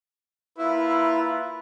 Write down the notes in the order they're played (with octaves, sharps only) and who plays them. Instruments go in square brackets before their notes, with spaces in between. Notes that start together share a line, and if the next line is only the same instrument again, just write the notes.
[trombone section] A#3 F4 B4 [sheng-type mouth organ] E4